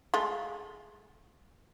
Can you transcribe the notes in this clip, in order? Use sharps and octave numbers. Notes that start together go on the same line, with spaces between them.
G#3 A3 F4